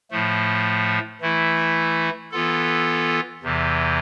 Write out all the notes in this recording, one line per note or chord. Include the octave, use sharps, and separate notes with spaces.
A2 F3 A3
E3 A3 E4
E3 B3 F4 A4
E2 C3 E3